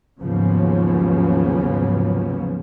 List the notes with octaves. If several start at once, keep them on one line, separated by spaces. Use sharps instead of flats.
D#2 G#2 C#3 F3 F#3 B3